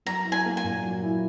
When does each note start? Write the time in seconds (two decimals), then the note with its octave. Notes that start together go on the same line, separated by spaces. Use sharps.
0.06 F#3 A#5
0.25 E4
0.32 G#5
0.45 A#3
0.57 G#5
0.64 A#2
0.83 F#3
1.03 E4